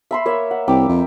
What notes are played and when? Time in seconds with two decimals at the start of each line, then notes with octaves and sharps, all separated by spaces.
0.11 E5 B5 C6
0.26 A#3 C#5 E5
0.51 F#5
0.68 C2 G5 D6
0.88 F2